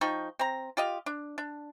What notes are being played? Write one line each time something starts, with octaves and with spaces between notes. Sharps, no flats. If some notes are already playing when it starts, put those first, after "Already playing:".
F3 D#4 G5 C#6
C4 A#5
F4 G4 D#5 F5
D4
D4